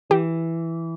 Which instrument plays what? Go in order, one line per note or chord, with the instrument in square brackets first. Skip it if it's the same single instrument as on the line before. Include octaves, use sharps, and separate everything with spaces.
[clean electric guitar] E3 [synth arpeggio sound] G4